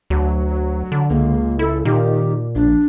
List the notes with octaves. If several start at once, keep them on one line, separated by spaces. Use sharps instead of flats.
D2 F#3
D3
C#2 A#3
E4 A4
A#2 D#3 G4
A#1 D4